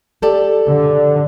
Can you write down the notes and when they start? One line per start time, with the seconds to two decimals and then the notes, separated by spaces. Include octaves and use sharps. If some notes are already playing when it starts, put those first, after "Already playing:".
0.22 G4 A4 D5
0.69 D3